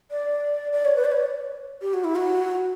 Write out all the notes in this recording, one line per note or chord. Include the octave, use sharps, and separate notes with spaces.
D5
D5
C#5
B4
D5
C#5
G4
F#4
E4
F#4